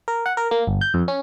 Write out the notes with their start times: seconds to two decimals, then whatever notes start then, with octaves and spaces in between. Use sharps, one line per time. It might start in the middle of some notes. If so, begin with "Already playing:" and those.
0.08 A#4
0.26 F#5
0.37 A#4
0.51 A#3
0.67 G1
0.81 G6
0.94 F2
1.08 C#4